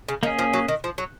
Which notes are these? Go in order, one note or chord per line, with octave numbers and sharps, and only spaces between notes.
C#3
D#3 A#3 C#4 G#4
F3
F#3
D#3
F3
F#3